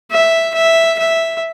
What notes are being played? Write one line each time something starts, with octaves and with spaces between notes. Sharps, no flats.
E5
E5
E5